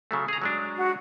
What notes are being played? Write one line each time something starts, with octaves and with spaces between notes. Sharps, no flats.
C#3 F#3 A3
G#4 A#5
F#3 G#3 D4
F#4